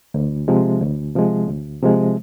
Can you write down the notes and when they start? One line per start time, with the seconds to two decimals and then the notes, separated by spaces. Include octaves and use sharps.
0.14 D2
0.48 C3 F3 G#3
0.81 D2
1.16 C3 F3 G#3
1.48 D2
1.82 C3 F3 G#3